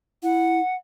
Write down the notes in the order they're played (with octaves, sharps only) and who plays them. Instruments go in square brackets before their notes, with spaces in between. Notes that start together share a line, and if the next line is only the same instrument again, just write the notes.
[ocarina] E4 [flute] F#5